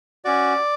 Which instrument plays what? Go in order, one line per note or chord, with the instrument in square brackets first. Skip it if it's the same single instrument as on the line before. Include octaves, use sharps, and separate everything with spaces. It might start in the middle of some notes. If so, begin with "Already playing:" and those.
[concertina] C#4 F#4 D5